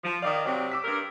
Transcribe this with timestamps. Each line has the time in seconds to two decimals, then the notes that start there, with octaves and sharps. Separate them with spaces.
0.03 F3
0.22 D#3 D5 F5 D6 D#6
0.45 C3 F#3 C4 D5 G5 D6
0.72 D6 E6 B6
0.84 G2 A#4